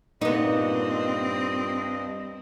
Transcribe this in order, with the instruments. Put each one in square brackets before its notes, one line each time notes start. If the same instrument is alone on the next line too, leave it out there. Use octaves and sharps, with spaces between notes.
[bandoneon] G2 D#5 [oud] A#2 B3 [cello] C4 [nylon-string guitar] D#4